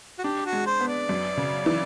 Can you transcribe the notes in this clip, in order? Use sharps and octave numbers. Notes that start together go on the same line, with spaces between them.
F#4
D4 G4
F#4
G#3
C5
B3
D5
F#2
C#3
E3